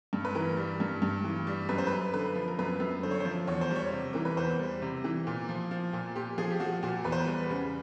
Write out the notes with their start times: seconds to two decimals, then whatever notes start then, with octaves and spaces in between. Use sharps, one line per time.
0.13 G2
0.25 B4
0.35 E3 A#4
0.57 G3
0.80 G2
1.02 G2
1.24 E3
1.47 G3
1.69 F#2 B4
1.78 C5
1.87 B4
1.91 F#2
2.13 D3 B4
2.35 F3
2.47 A#4
2.59 F#2 B4
2.80 F#2
3.03 D3 C5
3.11 C#5
3.20 C5
3.25 F3
3.47 E2 C#5
3.61 C5
3.71 G3 C#5
3.93 C3
4.13 E3 A#4
4.25 B4
4.37 E2 C5
4.59 G3
4.82 C3
5.04 E3
5.27 A#2
5.49 F3
5.71 F3
5.93 A#2
6.16 A#2 G4
6.38 F3 G#4
6.50 G4
6.60 F3 F#4
6.83 A#2 F#4
7.04 E2 B4
7.12 C5
7.20 B4
7.27 G3
7.50 C#3